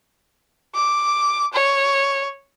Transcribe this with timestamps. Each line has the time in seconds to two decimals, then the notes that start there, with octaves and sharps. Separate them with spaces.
0.74 D6
1.53 C#5